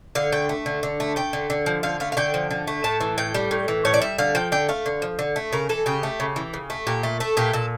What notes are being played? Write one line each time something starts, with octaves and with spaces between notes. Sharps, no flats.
D3 F5
A3 G5
A3
D3
D3
A3
A3 G5
D3
D3
F3
D3 F5
A3 F5
F5
D3 G5
F3
D3
A3
A2 A5
E3
A2 G5
G3
A2
E3
A2 C#5
D5
G3 E5
D3 F5
F3 G5
D3 G5
A3 F5
D3
F3
D3
A3
C#3 A#4
E3 A4
C#3 G4
A3
C#3
E3
C#3
A3
A#2 G4
A3
A3 A4
A#2 G4
A#2 A4